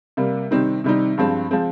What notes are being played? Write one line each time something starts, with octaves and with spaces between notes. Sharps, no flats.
C3 G3 A#3
C3 D#3 G3 C4 D#4
C3 D#3 G3 C4 D#4
G2 F3 G#3 C4
F3 G#3 C4